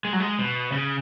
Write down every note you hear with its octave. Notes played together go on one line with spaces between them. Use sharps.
G#3
F#3
G#3
B2
C#3